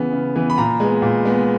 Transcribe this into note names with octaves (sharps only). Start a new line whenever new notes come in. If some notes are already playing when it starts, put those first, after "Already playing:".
Already playing: C#3 E3 B3
C#3
E3 B3
B5
A#2 A#5
G#3 B3
A#2
G#3 B3